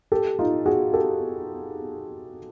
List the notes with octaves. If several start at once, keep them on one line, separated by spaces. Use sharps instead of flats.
G4 A4
D#4 F4
F#4 G#4
G4 A4